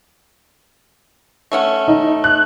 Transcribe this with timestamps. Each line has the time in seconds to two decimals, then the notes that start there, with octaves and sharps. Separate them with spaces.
1.52 A3 C#4 F#5
1.88 D#4
2.24 F#6